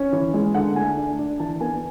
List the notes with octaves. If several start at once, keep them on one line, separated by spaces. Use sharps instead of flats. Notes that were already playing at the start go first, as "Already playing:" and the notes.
Already playing: C#4
E3
G#3
D3 F#5
A3 G#5
D4
D4
E3 A5
B3 G#5